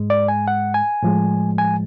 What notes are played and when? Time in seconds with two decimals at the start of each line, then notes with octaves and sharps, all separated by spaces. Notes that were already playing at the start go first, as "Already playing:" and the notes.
Already playing: G#2 G#3
0.10 D5
0.28 G#5
0.48 F#5
0.74 G#5
1.03 A2 F3 G#3
1.58 G#5